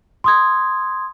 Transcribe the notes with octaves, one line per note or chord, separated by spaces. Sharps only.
C6 D#6 G#6